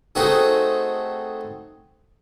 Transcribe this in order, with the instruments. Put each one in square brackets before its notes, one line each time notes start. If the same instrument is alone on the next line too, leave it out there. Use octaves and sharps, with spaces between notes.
[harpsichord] A3 C4 D#4 F#4 G#4